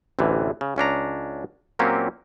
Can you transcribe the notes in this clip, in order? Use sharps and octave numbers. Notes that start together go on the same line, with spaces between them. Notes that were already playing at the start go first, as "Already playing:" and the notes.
A1 D2 C3 E3
C#3
C#2 C#4 D4 A#5
A#2 F#3 A#3 C4 C#4 G4